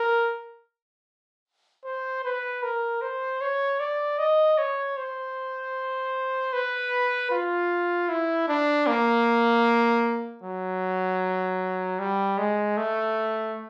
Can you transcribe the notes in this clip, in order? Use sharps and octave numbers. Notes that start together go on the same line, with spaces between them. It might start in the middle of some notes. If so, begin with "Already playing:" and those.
Already playing: A#4
C5
B4
A#4
C5
C#5
D5
D#5
C#5
C5
B4
F4
E4
D4
A#3
F#3
G3
G#3
A3